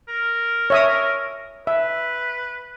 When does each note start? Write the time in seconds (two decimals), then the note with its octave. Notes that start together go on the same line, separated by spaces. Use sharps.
0.08 A#4
0.70 C#5 E5 D#6
1.67 B4 E5